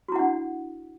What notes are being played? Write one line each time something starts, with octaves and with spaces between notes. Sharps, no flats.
D4 E4 F#4 F#5